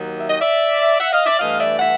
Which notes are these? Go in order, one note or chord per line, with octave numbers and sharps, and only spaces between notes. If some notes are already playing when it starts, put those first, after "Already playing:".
Already playing: D#2 D#3 F#3 A#3
E5
D#5
D5 E5
E5 F#5
D#5 F5
D5 E5
G2 E3 A3 D#5 F5
D5 E5
E5 F#5